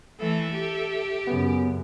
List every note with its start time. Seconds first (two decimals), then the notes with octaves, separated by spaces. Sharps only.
0.20 E3 A3 A4 E5
0.51 G4
1.27 F#2 C#3 B3